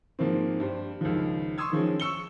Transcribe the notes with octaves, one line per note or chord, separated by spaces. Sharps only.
G#2 F3 A#3 C4
G2 G4 C5
C#2 D#3 F3
C6 C#6 D#6 E6 G#6
D#3 F3 G#3 C#4
C#6 E6 C#7 G7